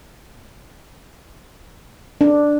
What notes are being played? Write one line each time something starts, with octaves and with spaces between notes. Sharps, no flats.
D4